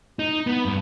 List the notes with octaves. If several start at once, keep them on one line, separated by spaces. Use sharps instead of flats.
D#4
B3
G2